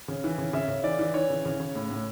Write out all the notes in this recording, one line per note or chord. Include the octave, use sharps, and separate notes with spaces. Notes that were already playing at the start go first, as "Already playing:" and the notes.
C#3
E3
C#3
C#3 E5
C#3
E3 D5
E3
E3 C#5
C#3
C#3
C#3
A2
A2